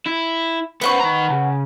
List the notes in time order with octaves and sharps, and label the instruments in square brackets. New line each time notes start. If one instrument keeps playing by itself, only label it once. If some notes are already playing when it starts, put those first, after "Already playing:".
[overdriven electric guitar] E4
[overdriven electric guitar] B3 C5 [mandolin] B4 F#5 C#6
[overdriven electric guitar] D#3 A#5
C#3